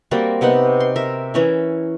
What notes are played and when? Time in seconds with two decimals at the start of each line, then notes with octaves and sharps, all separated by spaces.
0.11 G3 A#3 C4 F#4
0.41 C3 B3 D#4 F#5
0.80 C6
0.96 A#4 E5
1.34 E3 C#4 E4